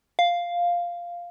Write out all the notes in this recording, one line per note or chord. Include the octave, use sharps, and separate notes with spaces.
F5